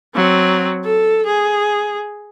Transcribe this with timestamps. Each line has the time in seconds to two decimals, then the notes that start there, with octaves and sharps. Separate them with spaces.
0.15 F#3 C4
0.84 A4
1.26 G#4